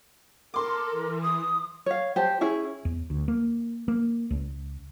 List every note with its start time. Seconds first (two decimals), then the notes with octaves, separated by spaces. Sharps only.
0.54 A4 A#4 C6 D6
0.91 E3
1.22 D#6
1.86 C#5 F5
2.16 G4 C5 A5
2.41 C#4 E4 G#4
2.85 E2
3.10 D2
3.28 A#3
3.88 A#3
4.30 C#2